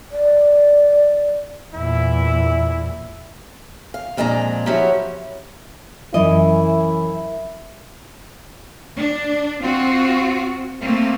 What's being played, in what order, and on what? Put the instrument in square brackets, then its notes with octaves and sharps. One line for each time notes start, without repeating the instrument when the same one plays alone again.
[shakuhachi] D5
[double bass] E2 A#2 [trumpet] E4
[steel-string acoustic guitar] F5
F2 A#2 G#3 D4 A#5
F3 F#3 C#4 E4 F#4 G4
[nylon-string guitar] F#2 E3 D#5 [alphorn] E4
[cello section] D4
C4 F4 F#4
A3 A#3 C4